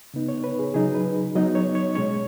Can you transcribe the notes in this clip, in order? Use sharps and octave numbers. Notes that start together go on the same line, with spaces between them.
C#3 B3 D#4
C#5
B4
G#4
C#3 F#3 D#4 G#4
B4
F#3 B3 D#4 D#5
C#5
C#5
B2 G#3 C#4 C#5